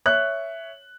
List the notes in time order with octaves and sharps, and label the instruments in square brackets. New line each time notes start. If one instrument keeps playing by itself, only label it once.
[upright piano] C#5 E5 F#6